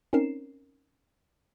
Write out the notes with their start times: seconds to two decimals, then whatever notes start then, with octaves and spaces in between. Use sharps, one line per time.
0.13 C4 C#4 D#4 A#4 C7 E7